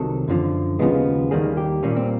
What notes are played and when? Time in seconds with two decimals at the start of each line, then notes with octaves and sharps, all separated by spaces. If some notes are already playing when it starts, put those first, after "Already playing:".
Already playing: C2 C3 D#3 F#3 A4
0.28 F#2 D3 F3
0.79 D#2 C#3 F3 G#3 B3
1.31 D#2 D#3 G3 A#3 G#4
1.57 G4
1.83 A#2 G3 A#3 C#4
1.96 C4